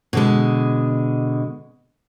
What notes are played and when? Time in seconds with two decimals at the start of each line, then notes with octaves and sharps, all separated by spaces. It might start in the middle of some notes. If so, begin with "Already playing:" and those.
0.13 B2 D3 G#3